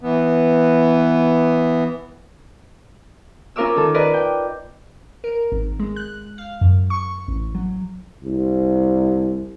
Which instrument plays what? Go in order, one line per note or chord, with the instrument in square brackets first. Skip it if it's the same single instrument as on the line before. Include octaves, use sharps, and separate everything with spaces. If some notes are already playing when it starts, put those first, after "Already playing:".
[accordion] E3 B3
[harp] C#4 F4 A#4 F5 D6 E6
D#3 A4
A#4 B4 D5 D#5
G5
[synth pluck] A#4
G#1
G#3
F#6
F5
F#2
C#6
A1
F#3
[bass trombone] C2